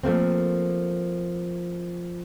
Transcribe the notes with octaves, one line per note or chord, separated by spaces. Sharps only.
F3 A3 A#3 C4